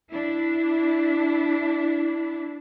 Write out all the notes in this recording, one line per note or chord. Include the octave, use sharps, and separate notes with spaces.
D4 E4